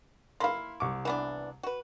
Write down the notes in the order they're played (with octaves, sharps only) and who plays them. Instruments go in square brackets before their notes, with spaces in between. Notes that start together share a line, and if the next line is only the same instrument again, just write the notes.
[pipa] A#3 E4 [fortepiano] F5 B5 C6
[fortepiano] C2 C#6 D6
[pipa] E3 B3 D4
F#4 B4